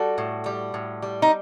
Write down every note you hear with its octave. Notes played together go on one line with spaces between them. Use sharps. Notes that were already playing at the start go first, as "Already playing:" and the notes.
Already playing: G3 F#4 A4
A2
G3
A2
G3
D#4